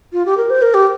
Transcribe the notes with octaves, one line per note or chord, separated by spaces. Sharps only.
F4
G4
A#4
C5
A#4
G4